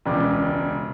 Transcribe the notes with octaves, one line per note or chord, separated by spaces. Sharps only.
E1 C#2 D6